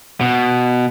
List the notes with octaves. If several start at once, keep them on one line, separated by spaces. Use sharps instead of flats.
B2